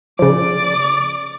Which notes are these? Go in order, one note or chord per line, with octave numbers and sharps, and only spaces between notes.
C#3 F3 D5 D6